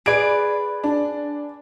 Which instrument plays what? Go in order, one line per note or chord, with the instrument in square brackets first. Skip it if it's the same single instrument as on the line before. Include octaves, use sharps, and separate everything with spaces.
[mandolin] G#4 B4 [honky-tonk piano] D5 D7
[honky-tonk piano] D4